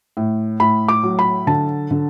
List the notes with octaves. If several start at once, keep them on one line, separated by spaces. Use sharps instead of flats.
A2
A2 B5
D6
F#3
B5
D3 A5
D3